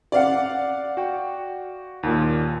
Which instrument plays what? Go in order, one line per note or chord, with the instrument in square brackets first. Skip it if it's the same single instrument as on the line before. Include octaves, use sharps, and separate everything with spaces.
[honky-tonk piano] D5 F5 F#5
[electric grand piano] F#4 G5
D#2 A#2